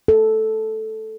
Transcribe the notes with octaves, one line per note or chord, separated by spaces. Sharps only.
A4